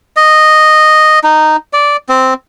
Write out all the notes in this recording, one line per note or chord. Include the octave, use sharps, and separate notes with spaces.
D#5
D#4
D5
C4